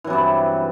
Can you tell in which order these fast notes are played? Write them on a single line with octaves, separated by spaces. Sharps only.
E3 F#3 C3 G2